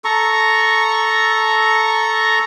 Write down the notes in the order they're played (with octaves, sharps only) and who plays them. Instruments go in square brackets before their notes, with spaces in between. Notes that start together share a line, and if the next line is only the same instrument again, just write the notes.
[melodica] A4 A#5 C#6